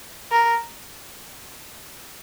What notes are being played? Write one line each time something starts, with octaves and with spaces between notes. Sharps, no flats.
A#4